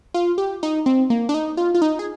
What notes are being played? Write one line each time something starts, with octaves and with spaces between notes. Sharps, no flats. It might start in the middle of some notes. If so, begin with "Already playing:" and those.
F4
G4
D#4
C4
A#3
D4
D#4
F4
F4
D#4
G#4